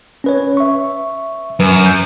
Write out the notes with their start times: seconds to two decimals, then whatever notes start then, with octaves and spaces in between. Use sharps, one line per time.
0.24 C#4 B4 C#5
0.57 E5 C#6
1.60 F#2 B4
1.86 G6